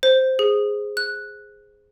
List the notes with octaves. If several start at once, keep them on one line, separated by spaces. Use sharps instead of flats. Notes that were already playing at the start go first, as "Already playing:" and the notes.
C5
G#4
F#6